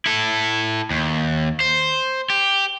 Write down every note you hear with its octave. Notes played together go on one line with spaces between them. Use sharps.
E4 A4
D#2
C5
G4